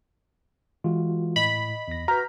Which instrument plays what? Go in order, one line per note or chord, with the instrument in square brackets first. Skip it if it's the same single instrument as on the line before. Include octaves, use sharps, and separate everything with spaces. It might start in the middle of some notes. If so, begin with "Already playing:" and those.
[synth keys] E3 G#3 [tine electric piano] F4 F#4
[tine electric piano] A2 [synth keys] D#5 [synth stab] B5
[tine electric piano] E2 A#6
[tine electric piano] F#4 B4 [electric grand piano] A#5 [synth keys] F6 G6 B6